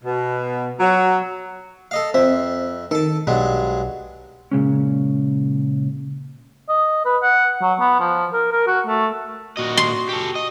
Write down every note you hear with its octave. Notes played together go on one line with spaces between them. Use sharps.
B2
F#3
A4 D#5 F5
F2 C4 E5
D#3 A4 A5
B1 G2 F#3 G#3
A#2 C#3 G#3 C#4
D#5
B4
F#5
F#3
B3
F3
A#4
A#4
F#4
A3
A#2 F#4 D#5
C6
G4 A4
D#5